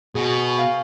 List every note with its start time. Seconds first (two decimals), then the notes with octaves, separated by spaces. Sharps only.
0.15 B2 F#4 G#4
0.58 F5